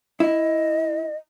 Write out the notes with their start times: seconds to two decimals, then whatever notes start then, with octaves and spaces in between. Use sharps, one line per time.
0.20 E4 D#5